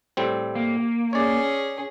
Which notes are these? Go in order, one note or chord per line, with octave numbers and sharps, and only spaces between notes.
A2 G3 C4
A#3
C#4 G#4 C#5 D5